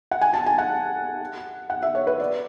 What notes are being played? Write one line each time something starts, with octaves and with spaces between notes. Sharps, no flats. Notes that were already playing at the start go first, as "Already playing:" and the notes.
F#5
G#5
A5
G#5
F#5
F#5
E5
C#5
B4
D5